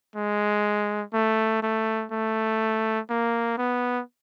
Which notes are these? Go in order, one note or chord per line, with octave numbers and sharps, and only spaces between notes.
G#3
A3
A3
A3
A#3
B3